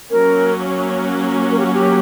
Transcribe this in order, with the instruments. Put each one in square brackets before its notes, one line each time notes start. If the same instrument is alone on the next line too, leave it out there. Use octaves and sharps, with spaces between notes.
[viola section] F#3 A#3 C#4 [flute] A#4
[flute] A#4
G4
F#4
G4